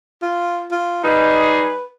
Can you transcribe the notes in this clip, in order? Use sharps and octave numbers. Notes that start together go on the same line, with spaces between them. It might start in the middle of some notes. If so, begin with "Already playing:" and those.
F4
F4
G3 D#4 G#4 B4